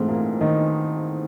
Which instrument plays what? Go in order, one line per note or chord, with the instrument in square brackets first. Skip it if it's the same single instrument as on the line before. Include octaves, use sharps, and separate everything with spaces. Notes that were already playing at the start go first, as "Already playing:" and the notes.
Already playing: [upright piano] G#2 G#3 [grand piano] E3 A3 C4 E4
[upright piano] A#2 A#3
D#3 D#4